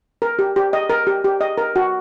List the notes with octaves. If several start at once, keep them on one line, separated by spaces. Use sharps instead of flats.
A#4
G4
G4
D#5
A#4
G4
G4
D#5
A#4
F#4